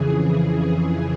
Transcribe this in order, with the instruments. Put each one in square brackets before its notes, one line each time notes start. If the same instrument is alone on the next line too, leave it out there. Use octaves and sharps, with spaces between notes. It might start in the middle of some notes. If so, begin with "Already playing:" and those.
Already playing: [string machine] F2 C#3 E3 G#4